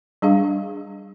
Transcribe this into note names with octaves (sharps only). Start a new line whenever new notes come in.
G3 D4 G#4 F5